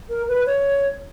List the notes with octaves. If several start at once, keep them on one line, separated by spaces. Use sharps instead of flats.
A#4
B4
C#5